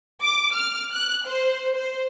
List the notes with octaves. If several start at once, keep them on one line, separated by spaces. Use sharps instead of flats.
D6
F6
F#6
C5
C5